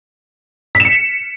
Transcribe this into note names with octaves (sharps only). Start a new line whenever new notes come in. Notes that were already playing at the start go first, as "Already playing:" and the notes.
B6
E7
C#7